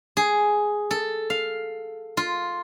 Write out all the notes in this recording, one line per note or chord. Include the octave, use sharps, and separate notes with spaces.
G#4
A4
F5
F4